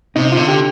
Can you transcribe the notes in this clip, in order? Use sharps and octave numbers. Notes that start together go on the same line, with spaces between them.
C3 D#4
F4
D3
G4